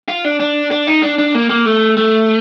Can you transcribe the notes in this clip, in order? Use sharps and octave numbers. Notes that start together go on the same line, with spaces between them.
F4
D4
D4
D4
D#4
D4
D4
A#3
A#3
A3
A3